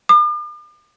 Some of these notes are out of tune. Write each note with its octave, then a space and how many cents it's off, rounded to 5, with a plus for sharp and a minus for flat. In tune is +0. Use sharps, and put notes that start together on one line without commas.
D6 +45